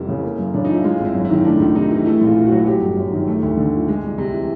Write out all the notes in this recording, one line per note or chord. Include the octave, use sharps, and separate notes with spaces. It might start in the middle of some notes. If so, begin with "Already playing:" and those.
Already playing: F1 G3 E4
C#3
A#3
F#2
C#3 D4
F3 D#4
E4
G#3 F4
G#1
E4
F#2
E4
D#3
A3 D4
C#2
C3 D#4
E3
A3 E4
A#1 F4
A#2
F#4
F#3
F#3 G4
G1
F#2
D#3
A3
D2
D3
F3
G#3
C2
C3
E3